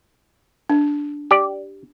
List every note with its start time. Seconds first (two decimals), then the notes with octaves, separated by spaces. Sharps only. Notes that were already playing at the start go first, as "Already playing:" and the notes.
0.69 D4
1.31 G4 D5